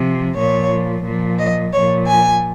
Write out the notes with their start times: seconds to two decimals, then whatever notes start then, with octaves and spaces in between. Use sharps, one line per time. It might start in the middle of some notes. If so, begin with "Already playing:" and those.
Already playing: C3 F3
0.36 A#2 F3 C#5
1.05 A#2 F3
1.38 D#5
1.73 A#2 F3 C#5
2.07 G#5